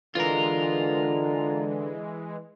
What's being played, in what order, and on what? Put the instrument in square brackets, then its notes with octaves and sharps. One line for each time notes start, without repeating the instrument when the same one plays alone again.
[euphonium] D3 [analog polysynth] E3 G#3 [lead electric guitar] F4 A#4